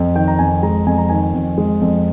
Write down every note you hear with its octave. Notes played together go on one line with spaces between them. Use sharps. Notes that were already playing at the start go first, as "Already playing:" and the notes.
Already playing: F2
D#3 G5
A#5
F2 G#5
G#3 A#5
F2 G#5
A#5
D#3 G#5
F2
G#3
F2